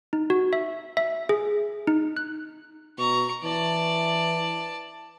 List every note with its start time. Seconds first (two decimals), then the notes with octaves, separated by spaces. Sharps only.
0.13 D#4
0.30 F#4
0.53 E5
0.97 E5
1.29 G#4
1.87 D#4
2.17 F#6
2.98 B2 A#5 C#6
3.43 E3 D5 A5